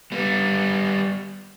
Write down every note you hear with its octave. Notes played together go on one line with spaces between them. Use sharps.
G3 B3